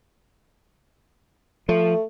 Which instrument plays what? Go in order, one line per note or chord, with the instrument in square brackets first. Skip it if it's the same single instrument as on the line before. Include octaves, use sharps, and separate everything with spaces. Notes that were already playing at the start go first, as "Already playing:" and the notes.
[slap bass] F3 [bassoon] A3